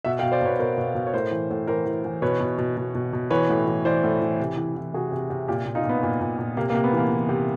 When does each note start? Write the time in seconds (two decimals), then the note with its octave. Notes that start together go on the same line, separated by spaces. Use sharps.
0.05 B2 E5 F#5
0.19 F5 G5
0.23 B2
0.32 C5 D5
0.42 B2 B4 C#5
0.59 B2 A#4 C5
0.78 B2
0.95 B2
1.07 C#5
1.13 A2 A#4 C5
1.31 E3
1.50 A2
1.67 E3 A#4 C5
1.85 E3
2.05 E3
2.22 B2 B4 C#5
2.40 B2
2.58 B2
2.77 B2
2.95 B2
3.13 B2
3.30 E3 B4 C#5
3.49 A2
3.67 E3
3.85 E3 C5 D5
4.03 A2
4.21 E3
4.40 C3
4.57 E3
4.76 E3
4.94 C3 F#4 G#4
5.12 C3
5.30 C3
5.47 A#2 F4 G4
5.66 A#2
5.75 D#4 F4
5.84 A#2
5.89 B3
6.03 A#2
6.21 A#2
6.39 A#2
6.57 C3 A#3
6.70 A#3
6.75 C3
6.84 B3
6.93 E3 A#3
7.10 E3
7.29 C3